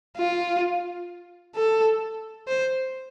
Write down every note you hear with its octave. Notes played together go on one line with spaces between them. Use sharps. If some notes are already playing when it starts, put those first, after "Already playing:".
F4
A4
C5